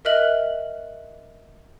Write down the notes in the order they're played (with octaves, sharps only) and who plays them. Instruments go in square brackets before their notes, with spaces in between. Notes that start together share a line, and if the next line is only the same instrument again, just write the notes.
[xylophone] A#4 D#5 E5 F6 F#6 F#7